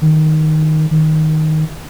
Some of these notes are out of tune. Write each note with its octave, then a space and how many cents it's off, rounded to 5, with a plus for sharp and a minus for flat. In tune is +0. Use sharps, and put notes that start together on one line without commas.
D#3 +0
D#3 +5